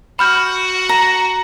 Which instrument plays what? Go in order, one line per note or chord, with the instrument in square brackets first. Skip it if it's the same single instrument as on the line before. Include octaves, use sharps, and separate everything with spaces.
[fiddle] F#4 [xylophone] B5 F6 G6
[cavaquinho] A#5